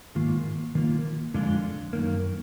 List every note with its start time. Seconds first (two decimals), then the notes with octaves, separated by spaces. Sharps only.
0.15 G#2 D#3 A#3 F4
0.75 D#3 A#3 F4
1.34 F2 D3 G#3 D4 F4
1.93 F#2 D#3 A#3